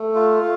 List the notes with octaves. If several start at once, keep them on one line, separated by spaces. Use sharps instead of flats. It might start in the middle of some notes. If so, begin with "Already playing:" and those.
Already playing: A3
F4